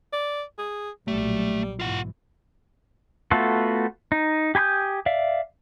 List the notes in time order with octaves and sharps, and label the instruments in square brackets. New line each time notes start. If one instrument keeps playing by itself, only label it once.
[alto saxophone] D5
G#4
[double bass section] B1 A#2 F#3 [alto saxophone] G3 [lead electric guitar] A3
[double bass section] G#2 B2 E3 [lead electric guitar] F4 F#5
[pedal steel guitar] A3 B3 F4 F#4 A4
D#4
G4 G#5 B5 D#6 G6
D5 E5 F5